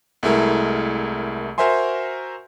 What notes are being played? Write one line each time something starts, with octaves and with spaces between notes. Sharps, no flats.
C2 G#3 A3 E4 A#4 A#5
F#4 A#4 C5 E5 G#5 C6